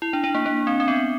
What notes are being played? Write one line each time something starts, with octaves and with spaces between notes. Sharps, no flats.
E4
D4
D4
A#3
A#3
C4
C4
B3